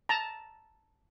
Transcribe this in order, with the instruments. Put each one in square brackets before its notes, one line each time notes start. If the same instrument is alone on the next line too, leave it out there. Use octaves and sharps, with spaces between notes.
[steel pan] A5 A#5